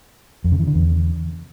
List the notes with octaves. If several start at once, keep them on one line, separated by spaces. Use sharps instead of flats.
F2
C#3
E3
D3
E2